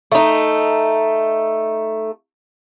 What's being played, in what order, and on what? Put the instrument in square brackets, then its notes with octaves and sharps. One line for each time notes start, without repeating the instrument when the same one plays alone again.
[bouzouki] A3 D#4